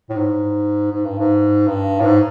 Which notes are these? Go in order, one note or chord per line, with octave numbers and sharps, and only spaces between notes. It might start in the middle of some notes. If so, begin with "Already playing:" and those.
A2
G#2
G#2
G2
G#2
G2
A2
G#2